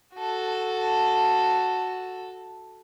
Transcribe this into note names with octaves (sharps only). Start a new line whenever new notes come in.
F#4 A4